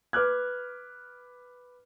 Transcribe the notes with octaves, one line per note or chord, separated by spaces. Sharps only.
B4 D6 F6 F#6 G#6